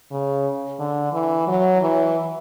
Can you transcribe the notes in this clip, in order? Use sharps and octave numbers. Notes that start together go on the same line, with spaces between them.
C#3
D3
E3
F#3
E3